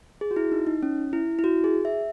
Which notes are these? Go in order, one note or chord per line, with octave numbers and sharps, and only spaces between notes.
G#4
F#4
E4
D#4
D#4
C#4
E4
E4
F#4
G#4
E5